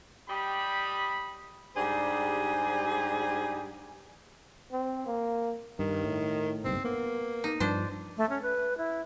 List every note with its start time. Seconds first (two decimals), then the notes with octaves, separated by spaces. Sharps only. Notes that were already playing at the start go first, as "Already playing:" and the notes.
0.29 G3 G4 D#5 B5
1.76 G#2 G3 D4 G4 G#4 C5
4.72 C4
5.06 A#3
5.79 G2 D#3
6.04 A2
6.64 F#1 B1 G2 C4
6.84 A#3 B3
7.44 D#4
7.60 G2 F3 D4 C5
8.17 A3
8.29 C#4
8.42 B4
8.78 E4